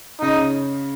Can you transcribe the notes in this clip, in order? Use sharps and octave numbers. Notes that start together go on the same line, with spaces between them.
C#3 D#4